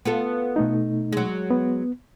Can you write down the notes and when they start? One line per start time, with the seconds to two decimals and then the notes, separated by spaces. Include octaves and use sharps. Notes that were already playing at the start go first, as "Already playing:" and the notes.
0.05 B3 F4 A4
0.56 B2 A3 D#4
1.12 F#3 G#3
1.51 B3